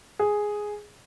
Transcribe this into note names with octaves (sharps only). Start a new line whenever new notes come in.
G#4